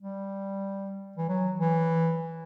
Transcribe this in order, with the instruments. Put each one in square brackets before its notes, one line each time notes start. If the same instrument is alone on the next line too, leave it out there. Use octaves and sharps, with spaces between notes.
[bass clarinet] G3
E3
F#3
E3